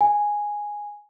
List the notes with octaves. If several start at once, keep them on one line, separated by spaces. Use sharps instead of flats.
G#5